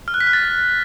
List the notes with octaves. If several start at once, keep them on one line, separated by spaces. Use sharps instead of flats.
F6
F#6
B6
F#6
A6